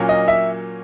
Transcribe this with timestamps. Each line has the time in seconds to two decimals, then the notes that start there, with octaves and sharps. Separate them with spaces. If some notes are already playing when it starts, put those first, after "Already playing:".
Already playing: A#2 F#3 A#3 C#4
0.09 D#5
0.28 E5